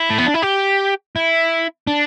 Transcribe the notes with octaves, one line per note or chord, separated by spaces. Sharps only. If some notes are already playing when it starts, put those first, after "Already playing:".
Already playing: E4
A3
B3
D4
E4
G4
E4
D4